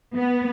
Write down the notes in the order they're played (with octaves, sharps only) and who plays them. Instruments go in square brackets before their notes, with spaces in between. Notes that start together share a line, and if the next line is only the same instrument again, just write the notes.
[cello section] B3